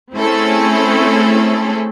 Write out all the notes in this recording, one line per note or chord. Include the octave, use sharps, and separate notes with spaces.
A3 C4 C#4 E4 G#4 A4